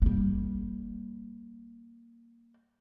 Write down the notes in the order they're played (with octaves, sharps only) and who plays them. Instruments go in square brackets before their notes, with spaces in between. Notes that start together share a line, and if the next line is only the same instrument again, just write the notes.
[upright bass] G3 A#3